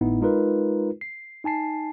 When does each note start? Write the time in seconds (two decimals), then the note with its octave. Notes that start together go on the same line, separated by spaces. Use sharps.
0.01 G#1 A2 B3 D#4 E4
0.21 G#3 D#4 F4 A#4 B4
1.01 C7
1.44 D#4 G#5 A5 C7